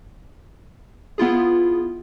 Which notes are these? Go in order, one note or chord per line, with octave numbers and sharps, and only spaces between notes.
B3 E4 F4 G#4